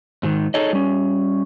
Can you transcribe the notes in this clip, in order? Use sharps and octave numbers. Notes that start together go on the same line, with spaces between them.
G#2 D#3
D#4 G#4 A4 C#5 D#5
G3 C#4